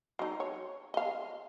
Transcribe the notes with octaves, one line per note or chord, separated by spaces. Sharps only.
F#3 D#4
C#5
D#5 F5